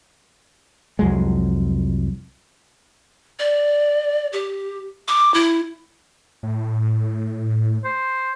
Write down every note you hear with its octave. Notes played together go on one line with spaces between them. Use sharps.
C2 F2 F#3 G#3
D5
G4
D6
E4
A2
C5